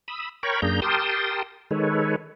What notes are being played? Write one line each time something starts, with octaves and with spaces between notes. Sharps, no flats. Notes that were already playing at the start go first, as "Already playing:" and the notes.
B5 D#6 E6
A#4 C#5 G5 A#5 B5 C#6
F#2 A#3 D4 G#4 A#5 G6
G4 A#4 G5 A5 C6 D#6
D#3 G#3 A4 B4 C#5